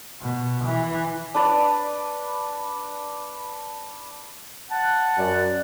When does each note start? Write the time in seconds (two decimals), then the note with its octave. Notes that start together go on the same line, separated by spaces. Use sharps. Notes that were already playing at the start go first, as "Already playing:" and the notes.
0.21 B2
0.64 E3
1.34 D4 B4 D5
4.71 F#5 A5
5.18 F#2 D5